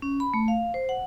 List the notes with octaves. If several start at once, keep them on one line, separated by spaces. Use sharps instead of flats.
C#4
B5
A3
F5
C5
F#5